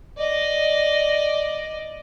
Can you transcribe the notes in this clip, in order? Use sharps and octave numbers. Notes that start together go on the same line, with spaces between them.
D5 D#5